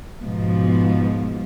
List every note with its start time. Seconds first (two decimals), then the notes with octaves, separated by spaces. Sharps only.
0.23 G#2 B2 F3